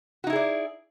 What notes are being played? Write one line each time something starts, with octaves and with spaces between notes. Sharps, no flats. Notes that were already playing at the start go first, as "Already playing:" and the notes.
D#4 E4 F#4 G#4 D5